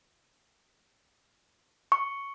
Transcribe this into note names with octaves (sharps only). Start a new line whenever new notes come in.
C#6